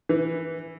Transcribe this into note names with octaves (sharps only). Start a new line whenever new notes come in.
E3